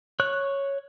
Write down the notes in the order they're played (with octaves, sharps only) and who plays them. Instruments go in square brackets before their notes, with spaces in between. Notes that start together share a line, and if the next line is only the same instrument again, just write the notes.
[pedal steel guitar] C#5 F#6